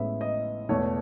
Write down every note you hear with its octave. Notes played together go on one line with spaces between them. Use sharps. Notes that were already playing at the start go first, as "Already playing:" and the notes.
Already playing: A1 A2 G#3 B3 E4 E5
D#5
E1 E2 B2 A3 C#5